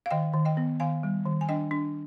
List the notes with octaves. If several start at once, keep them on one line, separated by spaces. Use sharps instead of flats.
F5
D#3 D#5 G5
D#3
D#5 G5
B3
D#3 F5 G#5
G3
D#3
G#5
D4 D#5 G5
D4